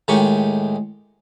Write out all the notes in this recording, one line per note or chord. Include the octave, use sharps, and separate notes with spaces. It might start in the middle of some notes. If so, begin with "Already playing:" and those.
A2 D#3 G#3 D#4 G4 C#6